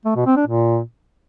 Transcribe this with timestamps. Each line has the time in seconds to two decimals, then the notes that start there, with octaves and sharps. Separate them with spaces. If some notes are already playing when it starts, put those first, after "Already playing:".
0.05 A3
0.16 B2
0.26 C4
0.36 D4
0.47 A#2